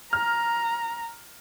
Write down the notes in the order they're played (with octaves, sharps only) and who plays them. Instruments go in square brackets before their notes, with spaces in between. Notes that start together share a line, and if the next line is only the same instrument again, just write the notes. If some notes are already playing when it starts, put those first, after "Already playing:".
[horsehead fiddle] A#5 [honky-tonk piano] F6